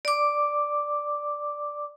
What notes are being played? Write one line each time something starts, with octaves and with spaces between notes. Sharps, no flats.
D5 D6